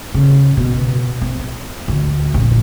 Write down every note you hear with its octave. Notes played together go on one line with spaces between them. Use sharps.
C#3
B2
C4
D2
F1 A#1